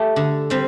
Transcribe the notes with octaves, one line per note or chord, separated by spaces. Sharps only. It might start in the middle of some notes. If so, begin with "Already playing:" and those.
Already playing: A3 G4
D3
G3 C4